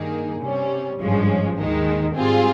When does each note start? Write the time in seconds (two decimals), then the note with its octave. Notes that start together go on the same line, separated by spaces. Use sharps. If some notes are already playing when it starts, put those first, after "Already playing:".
Already playing: G2 D#3 A#3 D#4 G#4
0.42 C3 G3 C#4
1.00 G#1 G2 F3 G#3 C#4
1.58 D#2 D#3 G#3 D#4
2.15 G#2 G3 C4 F4 G#4